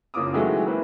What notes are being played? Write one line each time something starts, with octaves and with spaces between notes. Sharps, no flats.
F#1 A#3 F4 C#5 D6 D#6
D#3 E3 F#3 G#3 A3 F#4
E3 A#3 B4 C5